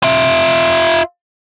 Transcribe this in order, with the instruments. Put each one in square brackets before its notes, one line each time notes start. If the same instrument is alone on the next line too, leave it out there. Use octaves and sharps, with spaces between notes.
[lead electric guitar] F4 E5